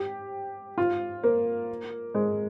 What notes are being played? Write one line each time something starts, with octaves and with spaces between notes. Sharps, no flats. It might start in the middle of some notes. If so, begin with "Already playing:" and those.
Already playing: G4
F4
A#3
G#3